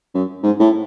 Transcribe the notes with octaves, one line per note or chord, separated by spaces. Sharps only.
F#2
G#2
A2